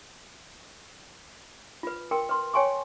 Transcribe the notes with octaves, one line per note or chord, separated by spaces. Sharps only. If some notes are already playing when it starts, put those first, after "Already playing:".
F4 B4
A#4 G5 C6
B4 C6
C#5 G5 G#5 C6 C#6